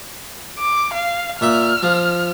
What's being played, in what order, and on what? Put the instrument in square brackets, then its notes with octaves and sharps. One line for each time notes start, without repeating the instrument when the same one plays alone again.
[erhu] D6
F5
[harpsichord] A#2 E5 [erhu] F6
[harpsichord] F3